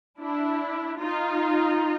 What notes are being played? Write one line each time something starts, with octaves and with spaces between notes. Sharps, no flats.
D4 E4
D#4 F4